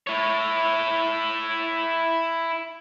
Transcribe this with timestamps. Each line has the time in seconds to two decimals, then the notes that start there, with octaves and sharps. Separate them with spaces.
0.07 E4 C#5